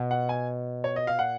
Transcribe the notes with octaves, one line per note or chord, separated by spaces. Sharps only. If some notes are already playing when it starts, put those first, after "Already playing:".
Already playing: B2
F#5
G#5
C#5
D#5
F5
A#2 F#5